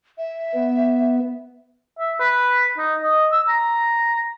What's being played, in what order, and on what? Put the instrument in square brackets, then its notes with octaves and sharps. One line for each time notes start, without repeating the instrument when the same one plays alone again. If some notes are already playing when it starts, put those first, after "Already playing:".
[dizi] E5
[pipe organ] B3
[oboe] E5
B4
D#4
D#5
E6
A#5